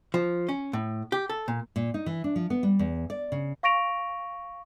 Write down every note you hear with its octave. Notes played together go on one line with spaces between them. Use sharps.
F3
C#4
A2
G4
A4
A#2
A#2
D#4
E3
D4
F3
B3
G3
E2
D5
C#3
F5 C#6 A#6 D7 F7